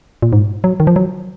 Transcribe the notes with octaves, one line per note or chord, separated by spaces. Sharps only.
A#2
G#2
F#3
D#3
F3
F#3